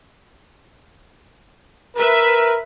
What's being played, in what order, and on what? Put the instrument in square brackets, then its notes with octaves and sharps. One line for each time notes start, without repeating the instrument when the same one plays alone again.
[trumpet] A#4 [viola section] B4 E5